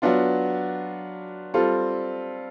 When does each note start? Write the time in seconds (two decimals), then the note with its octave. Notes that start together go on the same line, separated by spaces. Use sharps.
0.02 F#3 B3 D4 F4
1.54 G3 C4 F4 A4